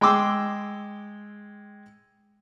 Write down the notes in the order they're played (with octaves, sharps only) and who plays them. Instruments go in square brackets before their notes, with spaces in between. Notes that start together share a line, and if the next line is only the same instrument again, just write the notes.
[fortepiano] G#3 G5 C6 D6 E6